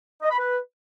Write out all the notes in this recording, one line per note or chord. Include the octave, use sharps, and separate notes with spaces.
D#5
B5
B4